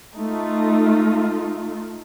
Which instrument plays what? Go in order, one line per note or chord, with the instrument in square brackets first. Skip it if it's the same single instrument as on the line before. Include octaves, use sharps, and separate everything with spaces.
[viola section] A3 D#4 F4